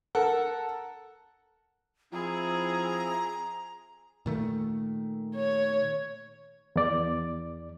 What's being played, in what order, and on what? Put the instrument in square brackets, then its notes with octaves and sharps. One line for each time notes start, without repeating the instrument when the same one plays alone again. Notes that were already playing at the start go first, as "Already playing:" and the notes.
[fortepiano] A4 A#4 F#5
[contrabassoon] F3 [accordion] C4 E4 [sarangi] G#4 [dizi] A#5
[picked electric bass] A#2 D#3 A3
[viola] C#5
[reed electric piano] E2 D5